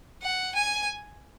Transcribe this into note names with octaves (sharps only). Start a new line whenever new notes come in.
F#5
G#5